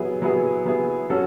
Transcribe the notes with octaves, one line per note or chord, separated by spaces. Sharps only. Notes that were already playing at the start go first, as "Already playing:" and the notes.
Already playing: F#3 B3 E4 G#4
F#3 B3 E4 G#4
F#3 B3 E4 G#4
F#3 C#4 F#4 A4